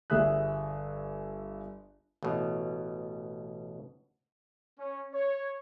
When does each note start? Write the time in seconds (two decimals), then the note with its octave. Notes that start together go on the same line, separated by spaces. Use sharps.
0.10 G1 G#4 E5 D#6 F#6
2.23 A1 B2
4.79 C#4
5.13 C#5